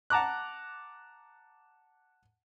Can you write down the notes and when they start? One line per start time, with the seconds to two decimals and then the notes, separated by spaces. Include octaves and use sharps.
0.10 F#5 A5 A#5 D6 F#6